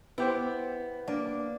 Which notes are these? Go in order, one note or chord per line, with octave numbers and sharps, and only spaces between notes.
B3 E4 G4 C5
A#3 D4